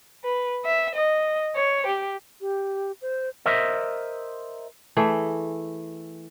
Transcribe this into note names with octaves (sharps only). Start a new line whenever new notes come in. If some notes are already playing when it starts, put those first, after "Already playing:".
B4
E5
D#5
C#5
G4
G4
C5
A#4 C5 D#5 E5
E3 A3 G#4